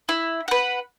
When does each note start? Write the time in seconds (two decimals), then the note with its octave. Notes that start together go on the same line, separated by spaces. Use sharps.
0.09 E4
0.48 B4 F#5